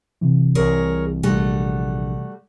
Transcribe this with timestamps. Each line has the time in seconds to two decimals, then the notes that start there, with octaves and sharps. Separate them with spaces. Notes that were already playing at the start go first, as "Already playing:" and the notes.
0.21 C3 E3
0.55 C2 G#4 A#4 C#5
1.23 A#1 G3 A3 F#4